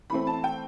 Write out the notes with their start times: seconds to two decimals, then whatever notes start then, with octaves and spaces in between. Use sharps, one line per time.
0.10 E3 A3 C4 B5
0.27 A5
0.44 G5